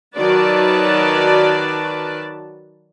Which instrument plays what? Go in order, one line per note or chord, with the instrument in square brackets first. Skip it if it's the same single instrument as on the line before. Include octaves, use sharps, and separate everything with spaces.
[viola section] D#3 F#3 F#4 B4 D5 A5